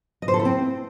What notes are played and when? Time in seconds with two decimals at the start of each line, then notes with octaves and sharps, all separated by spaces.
0.22 D#5
0.28 C5
0.34 A4
0.39 E4
0.45 C4